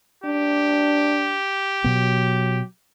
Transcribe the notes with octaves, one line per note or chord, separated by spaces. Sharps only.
D4 G4
B2 F#3 B3